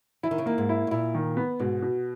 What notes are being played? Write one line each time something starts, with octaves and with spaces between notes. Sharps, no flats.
E3 E4
D#3
C#3
D#3 A#3
G#2
E4
B2
A#2 E4
D#3
B3
G#2 B2
B2